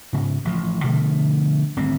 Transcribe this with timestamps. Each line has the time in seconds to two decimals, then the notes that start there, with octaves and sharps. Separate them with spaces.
0.13 G#2 C#3
0.45 A1 F3
0.83 B2 D3 F3 A3
1.76 G#1 D2 G3 C4